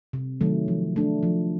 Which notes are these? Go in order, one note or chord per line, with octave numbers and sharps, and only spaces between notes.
C3
D#3 F#3 A3
F3
A3 D4
F3